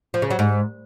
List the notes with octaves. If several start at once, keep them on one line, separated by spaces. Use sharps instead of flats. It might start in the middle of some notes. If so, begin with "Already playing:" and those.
F3
C#3
F#3
G#2